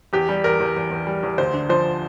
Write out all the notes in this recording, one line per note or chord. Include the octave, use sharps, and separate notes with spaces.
E2 G4
G3
E2 A#4
E2
E2
E2
G3
E2
D2 C5
D3
F3 C5